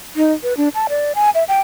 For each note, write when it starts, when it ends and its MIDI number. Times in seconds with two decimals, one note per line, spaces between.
0.16 0.33 63
0.43 0.56 71
0.57 0.69 62
0.75 0.87 81
0.89 1.12 74
1.15 1.30 80
1.35 1.44 76
1.48 1.61 79